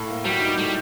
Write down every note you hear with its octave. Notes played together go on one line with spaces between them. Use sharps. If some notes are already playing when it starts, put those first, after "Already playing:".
Already playing: A2
A#3
F#3 G3
D#4
A2 G3